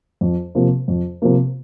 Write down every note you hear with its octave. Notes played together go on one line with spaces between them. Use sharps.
F2
C3 F3 A#3
F2
C3 F3 A#3